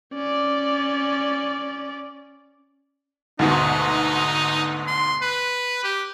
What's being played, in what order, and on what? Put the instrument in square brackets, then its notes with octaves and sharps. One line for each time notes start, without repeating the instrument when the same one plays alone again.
[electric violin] C#4 D5
[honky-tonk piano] D2 G#2 B2 [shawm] D#4
[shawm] C6
B4
G4